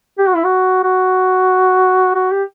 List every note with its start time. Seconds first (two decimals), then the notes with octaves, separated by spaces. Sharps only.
0.18 G4
0.27 F#4
0.35 E4
0.44 F#4
0.83 F#4
2.15 F#4
2.32 G4